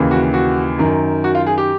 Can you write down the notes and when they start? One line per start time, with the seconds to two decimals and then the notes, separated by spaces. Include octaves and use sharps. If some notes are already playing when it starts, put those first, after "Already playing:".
Already playing: D#2 C#3 E3
0.11 F#4
0.34 F#4
0.79 F#2 D#3
1.24 F#4
1.35 F4
1.46 G#4
1.58 G4